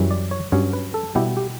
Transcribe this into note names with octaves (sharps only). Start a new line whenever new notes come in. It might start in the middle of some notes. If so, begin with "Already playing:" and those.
Already playing: F#2 E3 G3 C#4
D5
C#5
G2 F#3 C#4 C#5
B4
A4
B2 G3 B3 E4 G4
G4